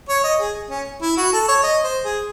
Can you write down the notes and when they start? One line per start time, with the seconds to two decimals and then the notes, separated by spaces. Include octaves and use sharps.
0.09 C#5
0.23 D#5
0.40 G#4
0.70 C#4
1.02 E4
1.17 F#4
1.33 A4
1.48 C#5
1.63 D#5
1.83 C5
2.05 G#4